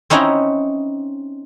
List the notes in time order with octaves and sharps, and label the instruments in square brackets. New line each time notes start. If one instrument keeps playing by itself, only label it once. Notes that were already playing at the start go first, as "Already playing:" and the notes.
[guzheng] C4 C#4 D#4 E4 F#5 A#5